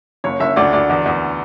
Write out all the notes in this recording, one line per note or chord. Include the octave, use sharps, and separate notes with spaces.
F#1 C#5
F#1 E5
D2 D5
D2 D5
E2
E2